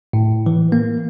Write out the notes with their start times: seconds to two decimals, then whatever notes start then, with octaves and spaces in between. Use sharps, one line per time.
0.13 A2
0.46 E3
0.72 A#3